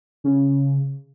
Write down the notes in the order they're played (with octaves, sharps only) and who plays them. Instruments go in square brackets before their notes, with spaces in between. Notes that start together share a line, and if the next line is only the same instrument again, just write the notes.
[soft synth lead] C#3